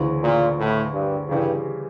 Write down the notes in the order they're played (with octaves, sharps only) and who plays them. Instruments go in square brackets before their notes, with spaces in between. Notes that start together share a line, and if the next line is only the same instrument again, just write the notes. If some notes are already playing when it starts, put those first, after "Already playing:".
Already playing: [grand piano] D2 C#3 E3
[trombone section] A#2
A2
G2
[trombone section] G2 [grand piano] C#3 E3 G3